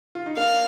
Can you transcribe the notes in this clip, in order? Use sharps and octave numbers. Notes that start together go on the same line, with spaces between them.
F4
D#4
A#3 D4 F5